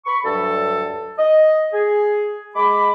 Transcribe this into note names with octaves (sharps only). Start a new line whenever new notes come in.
B5 C#6
D2 G2 F#3 A4
D#5
G#4
G#3 B5 D6